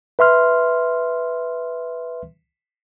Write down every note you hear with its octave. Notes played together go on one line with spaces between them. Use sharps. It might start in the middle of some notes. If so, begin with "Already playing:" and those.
B4 E5 C6 F6